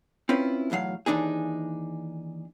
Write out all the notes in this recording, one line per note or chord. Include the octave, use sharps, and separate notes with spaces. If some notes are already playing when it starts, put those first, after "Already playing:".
C4 C#4 E4 F4 B4
B1 E2 A2 F#3 F5
D#2 E3 D4 D#4 G#4